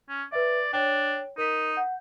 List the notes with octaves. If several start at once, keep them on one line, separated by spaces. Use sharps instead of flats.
C#4
B4 D5 E5
D4 C#5 G5
D#4 A#4 B6
F#5 G6